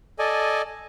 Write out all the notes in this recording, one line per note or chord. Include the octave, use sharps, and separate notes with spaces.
A4 D5 D#5 G#5